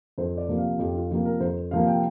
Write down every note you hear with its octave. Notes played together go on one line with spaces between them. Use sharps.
F2 C5
D5
C3 F3 A#3
F5
F2 G4
F4
C3 F3 A#3 G4
A#4
F2 C5
C3 F3 A#3 F5
G5